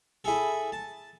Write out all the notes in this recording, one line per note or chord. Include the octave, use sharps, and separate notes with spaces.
E4 G#4 A4
A5